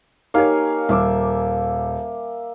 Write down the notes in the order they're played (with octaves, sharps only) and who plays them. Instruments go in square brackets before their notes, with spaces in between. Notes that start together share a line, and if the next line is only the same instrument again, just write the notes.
[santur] A#3 F5 G#5 [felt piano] D#4 G4 C#5
[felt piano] D#1 [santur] E5 D6 E6